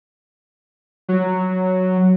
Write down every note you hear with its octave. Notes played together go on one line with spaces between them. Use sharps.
F#3